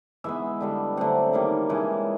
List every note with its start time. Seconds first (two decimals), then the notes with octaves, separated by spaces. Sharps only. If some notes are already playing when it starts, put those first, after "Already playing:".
0.24 E3 G#3 B3 E5
0.61 D3 G3 B3
0.97 D3 F#3 A3 C4 F#5
1.33 D#3 G3 A#3
1.69 C#3 E3 G#3